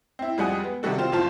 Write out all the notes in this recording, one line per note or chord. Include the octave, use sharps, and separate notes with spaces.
C4 E4
F2 G3 G#3 F#5 G#5 D#6
B3
C3 D#3 G3 F#4 A4
C4 F4 C5
F#1 F3 F4 C5 A5